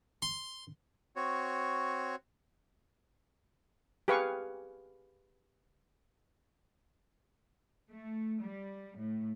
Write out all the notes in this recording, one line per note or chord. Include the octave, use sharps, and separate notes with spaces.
C6
C4 F#4 C#5
G4 G#4 B4 F5 G#5 C#6
A3
G3
A2